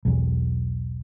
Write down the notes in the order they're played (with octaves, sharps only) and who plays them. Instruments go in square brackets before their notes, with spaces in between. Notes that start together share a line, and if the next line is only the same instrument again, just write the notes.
[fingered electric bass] B1 E2